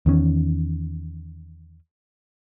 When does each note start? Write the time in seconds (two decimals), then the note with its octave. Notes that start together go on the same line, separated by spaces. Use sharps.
0.06 E2 D#3 C#4